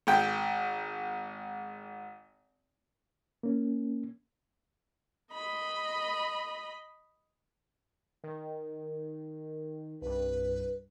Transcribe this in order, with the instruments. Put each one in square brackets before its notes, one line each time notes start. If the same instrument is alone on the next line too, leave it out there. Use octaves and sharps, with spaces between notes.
[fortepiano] G#1 G5
[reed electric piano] A#3 C#4
[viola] D#5 B5
[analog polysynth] D#3
[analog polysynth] C2 G2 [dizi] B4